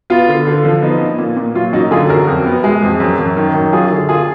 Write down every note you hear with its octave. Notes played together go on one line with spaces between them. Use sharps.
B3 F4
D3
D3
F3
B3 D#4
A#2
A#2
A#2
F#3 F4
F#2 D#4 F#4
D3 F4 G#4
F#2 F#4 A#4
F2
B3
G#3
F2
F#2
F#2
D#3
F#2
F#3 F4 G#4
D3
A#3 F4 G#4